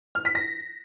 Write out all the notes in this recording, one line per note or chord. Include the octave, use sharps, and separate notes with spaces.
F6
B6
A#6